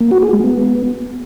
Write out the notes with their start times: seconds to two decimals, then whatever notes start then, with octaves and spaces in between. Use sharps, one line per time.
0.01 A#3
0.11 F#4
0.22 G#4
0.33 G#3
0.44 B3